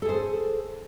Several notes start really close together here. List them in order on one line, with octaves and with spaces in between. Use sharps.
A4 G#4 C5